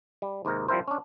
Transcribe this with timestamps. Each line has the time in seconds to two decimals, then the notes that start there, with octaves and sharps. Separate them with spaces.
0.22 G3
0.45 D#2 G#2 C3 A#4
0.68 F3 G3 C4 E4 A#4 C5
0.88 C#4 D4